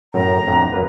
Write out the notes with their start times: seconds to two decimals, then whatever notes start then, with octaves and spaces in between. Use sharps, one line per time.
0.14 F#2 A2 A#5
0.47 F2 A2 D3
0.72 F#2 A#3 B4